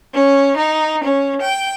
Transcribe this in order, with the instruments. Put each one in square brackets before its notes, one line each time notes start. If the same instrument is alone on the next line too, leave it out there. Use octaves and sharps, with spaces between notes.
[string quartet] C#4
D#4
C#4
G5